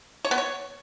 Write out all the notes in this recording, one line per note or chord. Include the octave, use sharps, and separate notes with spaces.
C#5
B3
C#5